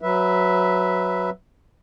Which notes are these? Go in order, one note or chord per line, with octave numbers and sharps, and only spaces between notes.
F#3 B4 E5